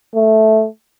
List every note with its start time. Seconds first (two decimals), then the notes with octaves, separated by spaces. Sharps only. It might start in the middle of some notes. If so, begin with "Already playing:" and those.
0.15 A3